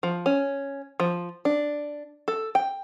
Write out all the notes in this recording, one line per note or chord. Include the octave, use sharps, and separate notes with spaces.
F3
C#4
F3
D4
A4
G5